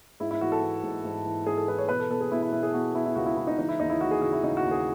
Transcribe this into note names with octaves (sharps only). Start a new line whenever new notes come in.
G#2 E4
E4
E3 F#4
A4
E3
G#2
G#2
E3
G#2 G#4
A4
E3 B4
C#5
B2 B4
A4
B2 A4
G#4
B2 E4
E4
B2 E4
G#4
B2 F#4
B2 E4
E4
C#2 F#4
E4
C#2 E4
D#4
E3 D#4
E4
D#2 D#4
E4
E3 F#4
G#4
C#3 F#4
E4
C#3 D#4
F#4
D#2
G#4